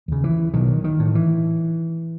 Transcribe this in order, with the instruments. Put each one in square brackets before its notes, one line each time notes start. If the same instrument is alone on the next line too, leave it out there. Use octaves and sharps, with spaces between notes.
[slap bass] D#2 C#3
E3
B1 D#3
D#3
A2
E3